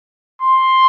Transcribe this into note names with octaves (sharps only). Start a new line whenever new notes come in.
C6